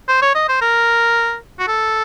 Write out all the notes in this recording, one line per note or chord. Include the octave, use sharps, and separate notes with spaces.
C5
C#5
D#5
C5
A#4
F#4
A4